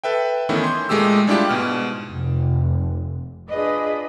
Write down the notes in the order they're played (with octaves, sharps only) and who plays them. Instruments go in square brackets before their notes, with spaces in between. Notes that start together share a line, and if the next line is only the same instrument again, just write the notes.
[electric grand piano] A4 B4 E5 G5
D#3 E3 A3 B3 C#4 E4
C6 G6
A#2 G#3 A3 G4 E6
G3 G#3 D4 E4 F4 G4
G#2 B2 F6
[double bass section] F1
[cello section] D4 F4 G#4 B4 D5 D#5